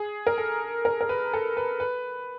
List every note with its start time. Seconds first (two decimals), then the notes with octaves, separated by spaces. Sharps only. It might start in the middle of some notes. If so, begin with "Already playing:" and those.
Already playing: G#4
0.27 A#4
0.38 A4
0.85 A#4
1.01 A#4
1.09 B4
1.33 A4
1.57 B4
1.80 B4